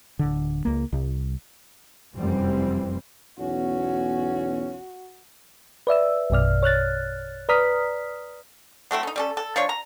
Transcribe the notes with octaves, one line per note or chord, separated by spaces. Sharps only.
D1 D3
C#2 A#3
C2
F1 F#2 E3 G3 C4
B1 E2 C#4 F#4
B4 D5 E5 E6
A#1 F#2 B2 D5 F6
C#5 F6 F#6 A6
B4 D5 A#5 D#6 F6 B6
F#3 A3 C4 E4
C#4 D#4
G3 C#4 A4
A4
F3 D4 F4 C#5
A#5